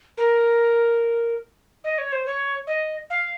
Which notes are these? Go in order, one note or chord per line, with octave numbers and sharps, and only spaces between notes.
A#4
D#5
C#5
C5
C#5
D#5
F5